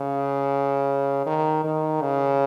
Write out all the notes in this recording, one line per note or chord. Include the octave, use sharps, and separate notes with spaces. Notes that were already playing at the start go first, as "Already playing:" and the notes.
Already playing: C#3
D#3
D#3
C#3